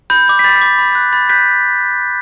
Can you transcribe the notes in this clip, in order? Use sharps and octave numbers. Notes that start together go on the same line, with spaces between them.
B5 G6
D6 G6
B6
B5 A6
D6 G6
B5
F#6
B5 A6
F#6 G6 B6